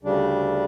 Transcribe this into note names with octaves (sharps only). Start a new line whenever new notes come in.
D2 C#3 G3 D4